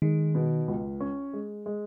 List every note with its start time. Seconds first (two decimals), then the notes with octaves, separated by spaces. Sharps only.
0.02 D#3 G#3
0.35 B2
0.68 C#2
1.00 C#4
1.33 G#3
1.66 G#3